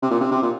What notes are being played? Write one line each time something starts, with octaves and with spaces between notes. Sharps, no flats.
C3
A#2
C3
C3
A#2